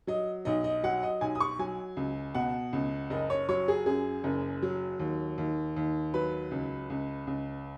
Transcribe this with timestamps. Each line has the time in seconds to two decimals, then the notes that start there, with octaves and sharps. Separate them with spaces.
0.07 F#3 D#5
0.45 B1 D#5
0.64 D#5
0.83 F#3 F#5
1.03 D#5
1.21 B1 G#5
1.35 D#6
1.40 C#6
1.59 F#3 G#5
1.97 C#2
2.35 B2 F#5
2.73 C#2
3.10 F#1 D#5
3.30 C#5
3.49 F#3 C#5
3.68 G#4
3.86 F#2 G#4
4.24 F#1
4.62 F#3
5.00 D#2
5.38 D#2
5.76 D#2
6.14 F#3 B4
6.51 C#2
6.90 C#2
7.27 C#2